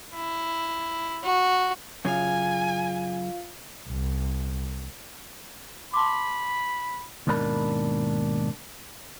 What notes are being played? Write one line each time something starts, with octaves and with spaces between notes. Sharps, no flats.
E4
F#4
F#2 C#3 F4 F5 G#5
C2
A5 B5 C6 D6
D#2 G#2 B2 D4 A#4 B5